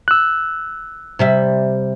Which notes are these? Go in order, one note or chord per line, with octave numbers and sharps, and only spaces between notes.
E6 F#6
C3 G3 E5